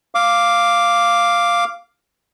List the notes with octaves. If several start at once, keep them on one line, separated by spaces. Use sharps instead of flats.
F5 D6